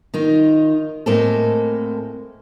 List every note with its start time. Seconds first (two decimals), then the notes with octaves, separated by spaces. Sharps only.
0.14 D#3 D#4 F4
1.06 A2 G#3 A#3 C4 A4